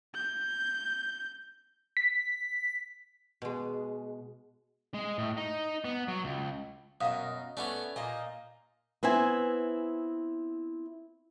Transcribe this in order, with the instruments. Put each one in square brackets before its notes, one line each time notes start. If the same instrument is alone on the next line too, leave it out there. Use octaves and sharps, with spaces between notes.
[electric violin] G6
[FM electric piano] B6
[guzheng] B2 G#3
[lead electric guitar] G#3
A2
D#4
B3
F#3
C#2
[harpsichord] F#2 [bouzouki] B2 A#4 D#5 [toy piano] F5 D#6
[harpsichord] A3 B3 C#4 [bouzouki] D5 G#5
[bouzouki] A#2 A#3 D#4 [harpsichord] D#5 [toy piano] G#5
[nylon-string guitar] B3 C4 E4 G#5